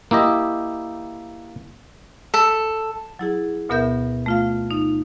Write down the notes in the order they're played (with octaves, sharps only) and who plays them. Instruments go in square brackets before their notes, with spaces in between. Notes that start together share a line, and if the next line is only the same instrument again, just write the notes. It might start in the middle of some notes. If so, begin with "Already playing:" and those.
[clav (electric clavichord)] A#3 E4 G4 D#5
[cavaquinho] A4
[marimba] F#3 E4 G#4
D2 B2 B3 A#4 E5 G6
A3 F4 F5
D#4